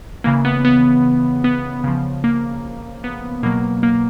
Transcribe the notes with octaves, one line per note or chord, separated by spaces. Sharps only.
C#3 E3 A#3
B3
B3
B3
C#3 F3
A#3
B3
B2 F#3 A#3
A#3